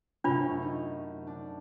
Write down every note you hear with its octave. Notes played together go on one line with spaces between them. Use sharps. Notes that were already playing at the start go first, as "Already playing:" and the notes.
F#2 C3 A3 D4 F4 B5
D#4
D4